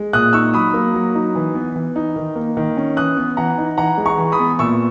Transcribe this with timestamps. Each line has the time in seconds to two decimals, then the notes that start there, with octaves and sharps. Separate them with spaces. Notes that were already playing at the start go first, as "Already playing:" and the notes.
Already playing: G#3
0.13 A#2 D#6 F#6
0.33 D#4 C#6 E6
0.54 F#3 B5 D#6
0.74 A#3
0.94 F#3
1.15 D#4
1.35 E3
1.55 B3
1.76 E3
1.96 D#4
2.16 D#3
2.36 A#3
2.57 D#3
2.77 C#4
2.97 E3 D#6 F#6
3.17 B3
3.37 E3 F#5 A#5
3.58 D#4
3.78 E3 F#5 A#5
3.98 G#3
4.06 A#5 C#6
4.18 E3
4.32 B5 D#6
4.39 B3
4.59 A#2 C#6 E6